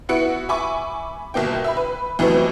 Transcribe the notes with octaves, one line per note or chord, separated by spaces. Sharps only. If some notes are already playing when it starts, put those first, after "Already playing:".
B3 E4 F#4 F#5 C#7 D7
E5 G#5 B5 C#6 D6
G1 B2 A#3 G5
E5 B5
B4
C2 F2 E3 F#3 A3 B3